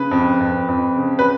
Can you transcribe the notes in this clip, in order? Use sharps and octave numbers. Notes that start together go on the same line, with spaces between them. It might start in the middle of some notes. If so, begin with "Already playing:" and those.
Already playing: C#3 B4
F2
F2
F2
C#3
B4